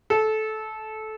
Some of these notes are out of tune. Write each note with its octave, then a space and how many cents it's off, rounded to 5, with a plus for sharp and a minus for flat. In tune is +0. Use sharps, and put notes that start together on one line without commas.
A4 -20